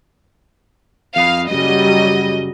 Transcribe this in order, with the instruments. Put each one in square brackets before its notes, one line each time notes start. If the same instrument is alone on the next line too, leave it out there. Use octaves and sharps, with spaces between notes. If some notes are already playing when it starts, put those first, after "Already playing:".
[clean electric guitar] F2 D#5 B5 [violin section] F5
[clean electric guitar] F#2 C#3 [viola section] F#3 G3 [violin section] D#5